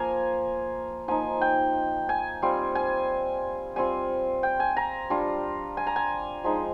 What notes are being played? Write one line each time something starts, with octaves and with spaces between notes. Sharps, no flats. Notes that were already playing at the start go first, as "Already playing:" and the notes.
Already playing: F3 A#3 F4 G#5 A#5
F3 A#3 D#4 G#5
G5
G#5
G3 C4 F4
G#5
G3 C4 F4 G#5
G5
G#5
A#5
G3 D4 F4
G#5
A#5
G#5
F3 G#3 D#4